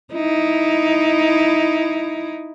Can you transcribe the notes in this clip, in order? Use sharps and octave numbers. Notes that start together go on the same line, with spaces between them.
D#4 E4